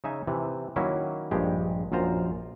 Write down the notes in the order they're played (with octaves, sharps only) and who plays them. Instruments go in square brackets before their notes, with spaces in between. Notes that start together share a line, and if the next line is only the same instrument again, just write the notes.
[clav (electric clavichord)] C#3 D#4 E5 G#5
C3 E3
D#3 F#3 A#3 C#4 E4
A#1 G2 G#3 G4
A#1 F#2 F4 C5 A#5